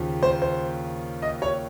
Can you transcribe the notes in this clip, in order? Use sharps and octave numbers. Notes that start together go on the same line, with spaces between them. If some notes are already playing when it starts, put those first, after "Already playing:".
Already playing: D#2 C#3 F3
C5
C5
D#5
C#5